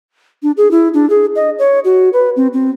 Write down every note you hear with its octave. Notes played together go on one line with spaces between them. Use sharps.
D4
G#4
E4
D4
G#4
D#5
C#5
F#4
B4
C4
C4